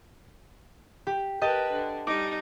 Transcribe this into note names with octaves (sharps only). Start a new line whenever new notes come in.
G4
G4 A#4 B4 D#5 A5
D3
G3 D#4 D6